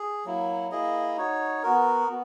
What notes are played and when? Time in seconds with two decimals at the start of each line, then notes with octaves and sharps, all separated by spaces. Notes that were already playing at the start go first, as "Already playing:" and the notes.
Already playing: G#4
0.25 F#3 A#3 E4
0.71 A#3 E4 G#4 D#5
1.17 D#4 F#4 C#5
1.63 B3 F#4 A#4
2.08 B3